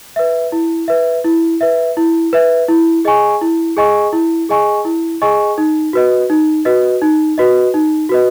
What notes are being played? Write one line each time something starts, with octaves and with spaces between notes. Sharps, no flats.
B4 E5
E4
B4 E5
E4
B4 E5
E4
B4 E5
E4
G#4 D#5 G#5 C#6
E4
G#4 D#5 G#5 C#6
E4
G#4 D#5 G#5 C#6
E4
G#4 D#5 G#5 C#6
D#4
F#4 B4 D#5
D#4
F#4 B4 D#5
D#4
F#4 B4 D#5
D#4
F#4 B4 D#5